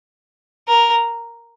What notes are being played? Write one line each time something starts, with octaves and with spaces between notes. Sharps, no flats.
A#4